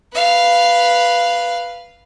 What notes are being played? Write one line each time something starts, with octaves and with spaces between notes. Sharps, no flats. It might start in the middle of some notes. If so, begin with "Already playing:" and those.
B4 F5